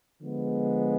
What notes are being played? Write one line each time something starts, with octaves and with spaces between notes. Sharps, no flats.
D3 F3 G#3 B3